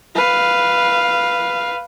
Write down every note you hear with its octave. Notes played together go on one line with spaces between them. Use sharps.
B4 F5